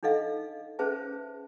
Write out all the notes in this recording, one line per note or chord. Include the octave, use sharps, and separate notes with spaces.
D4 D#4 A4 D#5 F5
C#4 G#4 B4 C5 E5 A5